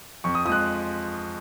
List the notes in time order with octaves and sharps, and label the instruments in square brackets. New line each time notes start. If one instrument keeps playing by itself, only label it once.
[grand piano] F2 C#6
D#6
F3 D#6
G#3 F#6